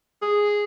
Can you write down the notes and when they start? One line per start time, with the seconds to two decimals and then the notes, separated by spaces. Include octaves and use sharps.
0.22 G#4